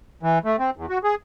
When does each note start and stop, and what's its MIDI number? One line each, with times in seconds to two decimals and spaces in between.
0.23 0.39 52
0.45 0.56 57
0.59 0.70 60
0.77 0.86 40
0.89 0.98 66
1.04 1.15 68